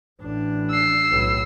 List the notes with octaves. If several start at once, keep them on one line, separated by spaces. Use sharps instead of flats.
A1 D4
E6 C7
B1 A2